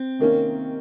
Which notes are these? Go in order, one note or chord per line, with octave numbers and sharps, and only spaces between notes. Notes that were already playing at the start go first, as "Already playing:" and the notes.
Already playing: C4
C3 D#3 A#3 C#4